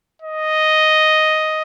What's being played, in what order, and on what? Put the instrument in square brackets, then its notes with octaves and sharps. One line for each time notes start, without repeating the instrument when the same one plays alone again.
[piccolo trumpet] D#5